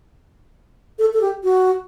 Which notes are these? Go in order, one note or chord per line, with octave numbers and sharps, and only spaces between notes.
A4
A4
G4
F#4